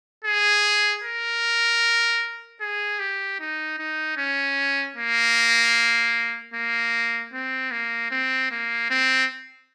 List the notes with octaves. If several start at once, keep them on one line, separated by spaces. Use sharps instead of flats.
G#4
A#4
G#4
G4
D#4
D#4
C#4
A#3
A#3
C4
A#3
C4
A#3
C4